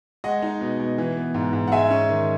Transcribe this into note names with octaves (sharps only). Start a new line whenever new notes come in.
G#3 D#5 F#5
D#4
B2
B2
E3
B3
G#2
G#2
F#5
G#3 E5 G#5
C#4
D#3